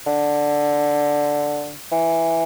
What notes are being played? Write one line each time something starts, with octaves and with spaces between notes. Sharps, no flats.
D3
E3